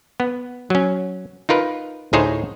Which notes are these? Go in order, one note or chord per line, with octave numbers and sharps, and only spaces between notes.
B3
F#3 C#4
D#4 F4 A#4 B4
D2 A2 D#4 G#4 C5 C#5